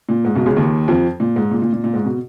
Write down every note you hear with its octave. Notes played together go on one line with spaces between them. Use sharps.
A#2
G#2
B1 B2
C#2 C#3
D#2 D#3
F2 F3
A#2
G#2
A#2
A#2
A#2
A#2
G#2
B2